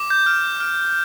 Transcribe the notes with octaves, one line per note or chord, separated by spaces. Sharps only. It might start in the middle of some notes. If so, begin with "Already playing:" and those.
Already playing: D6
G6
F6
F6